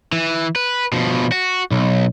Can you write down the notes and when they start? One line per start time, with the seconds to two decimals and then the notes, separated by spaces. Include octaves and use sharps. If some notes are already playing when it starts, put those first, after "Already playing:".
0.12 E3
0.56 B4
0.92 B2 F3
1.32 F#4
1.71 B1